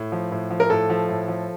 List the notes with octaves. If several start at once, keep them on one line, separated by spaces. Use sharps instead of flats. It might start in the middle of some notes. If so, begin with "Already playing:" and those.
Already playing: A2
F3
A2
F3
A#4
A2 A4
F3
A2
F3